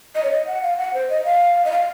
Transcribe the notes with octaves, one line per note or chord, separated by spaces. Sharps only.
D#5
C#5
D#5
F#5
F5
F#5
C5
D#5
F5
D#5
F5